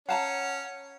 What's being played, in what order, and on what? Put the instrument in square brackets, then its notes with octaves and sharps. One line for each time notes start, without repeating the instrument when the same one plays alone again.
[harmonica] C#4 [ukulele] F5 A5 A#5 [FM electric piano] F#5